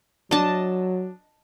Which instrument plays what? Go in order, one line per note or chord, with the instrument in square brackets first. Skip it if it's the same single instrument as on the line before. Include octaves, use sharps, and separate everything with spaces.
[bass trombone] F#3 [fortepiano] D4 [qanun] D#5 A5